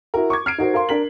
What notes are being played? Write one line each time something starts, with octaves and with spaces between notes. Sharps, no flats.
E4 F#4 A#4
C#6 D6 G#6
F6 C7 D7
D#4 F#4 A#4 C5
A#4 F5 C6
D4 A#4 B6 F#7